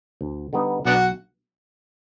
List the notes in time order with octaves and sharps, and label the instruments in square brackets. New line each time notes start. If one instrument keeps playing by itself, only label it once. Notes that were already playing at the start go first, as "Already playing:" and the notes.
[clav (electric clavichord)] D2
D3 G3 B3 D#4
[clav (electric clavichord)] B1 [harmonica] B3 D4 F#4